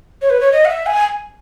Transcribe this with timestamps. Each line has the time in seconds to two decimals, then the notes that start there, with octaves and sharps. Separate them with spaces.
0.22 C#5
0.30 B4
0.41 C#5
0.52 D#5
0.65 F#5
0.69 E5
0.86 G#5